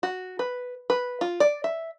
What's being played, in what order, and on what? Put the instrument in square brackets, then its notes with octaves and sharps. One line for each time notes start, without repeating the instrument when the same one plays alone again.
[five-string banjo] F#4
B4
B4
F4
D5
E5